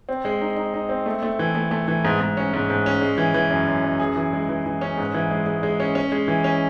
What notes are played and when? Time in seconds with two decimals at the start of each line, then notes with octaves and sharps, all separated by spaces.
0.09 C4
0.25 G#3
0.41 D#4
0.57 D#4
0.74 D#4
0.89 C4
1.06 A3
1.22 A3
1.39 E3
1.55 A3
1.71 A3
1.88 E3
2.05 G#2
2.21 G#2
2.37 C#4
2.54 G#2
2.70 G#2
2.86 C#4
3.01 G#3
3.18 E3
3.34 E3
3.50 F#2
3.67 F#2
3.84 F#2
3.99 G#4
4.16 E3
4.33 G#3
4.49 E3
4.66 E3
4.81 C#4
4.98 G#2
5.14 E3
5.31 G#3
5.46 G#3
5.63 G#3
5.80 C#4
5.95 C#4
6.12 G#3
6.28 E3
6.44 C#4